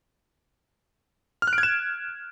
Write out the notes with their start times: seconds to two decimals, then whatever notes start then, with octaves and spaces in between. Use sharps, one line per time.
1.42 F6
1.47 F#6
1.53 D7
1.58 G#6
1.63 E7